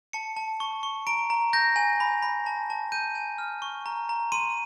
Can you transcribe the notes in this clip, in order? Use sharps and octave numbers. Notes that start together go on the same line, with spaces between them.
A5 C#7
A5
C#6
C#6
A#5 D7
A#5
G6 A#6
G#5
B5
B5
A5
A5
G6 D#7
G#5
F6
C#6
A#5
A#5
C6 D#7